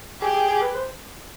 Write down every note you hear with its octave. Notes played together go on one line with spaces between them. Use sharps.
G4 G#4
G#4
G#4
B4
C5